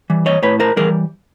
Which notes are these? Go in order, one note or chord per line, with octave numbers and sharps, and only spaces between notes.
E3 G3
C#5 D#5
A2 B4 C#5
A#4 C5
E3 G3 G#4 A#4